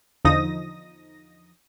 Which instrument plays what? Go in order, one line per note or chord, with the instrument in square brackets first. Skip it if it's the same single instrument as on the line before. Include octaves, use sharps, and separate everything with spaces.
[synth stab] E2 D3 F3 D#4 D#6 A#6